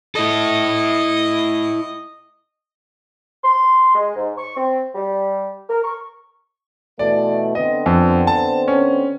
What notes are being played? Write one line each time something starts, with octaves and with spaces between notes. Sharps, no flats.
E4 A4 D#5
C6
G#3
G#2
C#6
C4
G3
A#4
C#6
B2 E3 A3 D5
D3 B3 C4 D#5
F2
A5
C#4